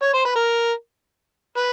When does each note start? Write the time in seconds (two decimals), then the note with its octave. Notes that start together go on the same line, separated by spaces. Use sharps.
0.02 C#5
0.14 C5
0.25 B4
0.36 A#4
1.57 B4